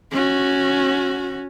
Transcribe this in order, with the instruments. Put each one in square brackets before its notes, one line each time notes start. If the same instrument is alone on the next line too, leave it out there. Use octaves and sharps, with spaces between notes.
[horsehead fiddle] C#4 F#4